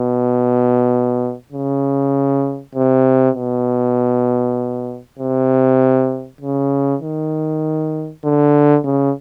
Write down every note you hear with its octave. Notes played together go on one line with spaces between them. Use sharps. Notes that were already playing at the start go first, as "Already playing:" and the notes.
Already playing: B2
C#3
C3
B2
C3
C#3
D#3
D3
C#3